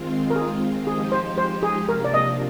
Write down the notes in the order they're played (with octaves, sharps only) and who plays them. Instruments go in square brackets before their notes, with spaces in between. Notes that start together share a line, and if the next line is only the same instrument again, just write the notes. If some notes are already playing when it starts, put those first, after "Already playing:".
Already playing: [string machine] D#3 G#3 C4 F4
[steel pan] A#4
G#4
[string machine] F3 G#3 D#4 G4 [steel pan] G#4
[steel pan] C5
C5
G#4
[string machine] C3 F3 A#3 D4 [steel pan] A#4
[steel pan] D5
D#5